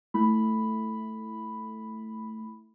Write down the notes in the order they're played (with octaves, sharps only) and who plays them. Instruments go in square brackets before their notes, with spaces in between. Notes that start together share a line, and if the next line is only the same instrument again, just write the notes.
[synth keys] A3 E4 B5